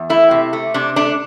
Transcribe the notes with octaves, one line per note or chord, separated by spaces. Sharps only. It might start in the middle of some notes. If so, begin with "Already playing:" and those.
Already playing: E2
A3 E4
C3
A3
C3 D4
A3 D4